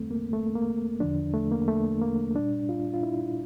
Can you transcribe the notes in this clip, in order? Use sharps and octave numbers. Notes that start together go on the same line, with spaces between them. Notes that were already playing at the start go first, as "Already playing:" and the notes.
Already playing: E2 D3 G3 A3 C4
A#3
A3
A#3
E2 D3 F3 D4
A3
A#3
A3
A#3
A#2 G3 D4
F4
F4
E4